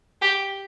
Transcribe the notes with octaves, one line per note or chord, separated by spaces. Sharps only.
G4